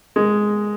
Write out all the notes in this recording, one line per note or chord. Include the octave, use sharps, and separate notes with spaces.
G#3